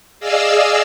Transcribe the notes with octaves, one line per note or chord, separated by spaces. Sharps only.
G#4 D5 D#5 F5 E6